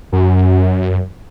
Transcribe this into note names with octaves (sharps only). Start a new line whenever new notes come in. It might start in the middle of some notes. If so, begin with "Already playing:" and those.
F#2